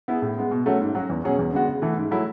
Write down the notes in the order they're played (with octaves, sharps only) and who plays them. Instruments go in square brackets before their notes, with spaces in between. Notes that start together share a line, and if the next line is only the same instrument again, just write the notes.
[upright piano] B3 E4 G#4
A2
G#3 B3
B2
F#3 A3 C#4 F#4
G#2
F#3 C#4 F#4
E2
B2 F#3 C#4 G#4
E2
D3 G#3 B3 F#4
C#3
E3 A3
G#2
F#3 A3 E4